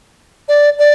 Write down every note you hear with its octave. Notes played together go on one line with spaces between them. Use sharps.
D5
D5